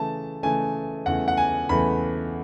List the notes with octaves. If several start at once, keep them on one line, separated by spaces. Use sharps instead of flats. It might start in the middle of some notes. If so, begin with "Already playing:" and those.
Already playing: C#3 E3 A3 A5
C#3 E3 A3 G#5
E2 C#3 E3 A3 F#5
F#5
G#5
E2 C#3 E3 A3 B5